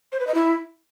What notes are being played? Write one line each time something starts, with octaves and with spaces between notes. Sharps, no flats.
C5
B4
D#5
E4